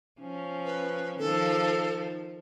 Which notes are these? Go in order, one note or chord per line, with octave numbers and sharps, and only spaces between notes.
F3 C#4
B4
D#3 F3 A4